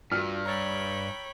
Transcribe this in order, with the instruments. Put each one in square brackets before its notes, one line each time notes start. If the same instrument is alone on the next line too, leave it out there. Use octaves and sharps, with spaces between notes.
[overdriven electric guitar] G2 [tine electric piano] F4 F#4 E6 [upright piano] F6
[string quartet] C#5 G5 B5 [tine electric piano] A#5 E6 A6